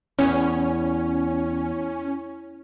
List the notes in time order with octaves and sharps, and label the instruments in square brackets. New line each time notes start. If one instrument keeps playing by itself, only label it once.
[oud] E2 [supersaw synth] C#4